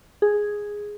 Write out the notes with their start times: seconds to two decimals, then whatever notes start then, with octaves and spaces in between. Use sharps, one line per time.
0.22 G#4